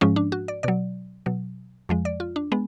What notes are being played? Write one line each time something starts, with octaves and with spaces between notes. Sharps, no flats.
G#2 F3 G#3 C#4
D4
F#4
D5
B2 F#3 D5
B2 F#3
F2 F3 G#3
D5
F4
D4
G#3 B3